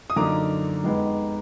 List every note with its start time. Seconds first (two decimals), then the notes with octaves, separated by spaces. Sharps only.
0.10 D#6
0.16 F#2 D3 F3 A#3 D#4 A#5 D6
0.84 F2 F3 G#3 B3 D#4